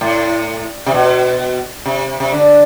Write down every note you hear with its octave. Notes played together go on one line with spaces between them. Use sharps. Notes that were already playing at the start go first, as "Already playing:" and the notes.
A2
C3
B2
C3
C3
D3